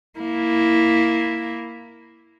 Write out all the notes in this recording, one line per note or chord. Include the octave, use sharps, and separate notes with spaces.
A#3 E4